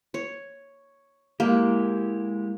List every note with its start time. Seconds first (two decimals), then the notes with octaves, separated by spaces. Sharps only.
0.14 C#5
1.40 G#3 A#3 E4 G4